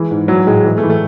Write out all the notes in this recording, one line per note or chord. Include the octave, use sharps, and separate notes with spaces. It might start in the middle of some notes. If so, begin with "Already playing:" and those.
Already playing: E3 G#3
G#2
E3 F#3
A2 G#3
E3 G#3
A3
E3
A3